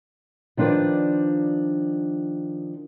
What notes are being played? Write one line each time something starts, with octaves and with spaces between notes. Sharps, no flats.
D#3 F3 D4 B4 D5